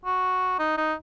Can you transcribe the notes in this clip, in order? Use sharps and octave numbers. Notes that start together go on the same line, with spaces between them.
F#4
D#4
D#4